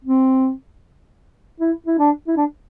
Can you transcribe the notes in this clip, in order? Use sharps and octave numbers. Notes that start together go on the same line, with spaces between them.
C4
E4
E4
D4
E4
D4